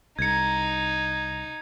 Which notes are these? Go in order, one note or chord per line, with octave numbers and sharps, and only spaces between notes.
C2 D#4 G#6 C#7